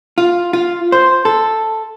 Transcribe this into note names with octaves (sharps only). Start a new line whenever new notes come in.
F4
F4
C5
A4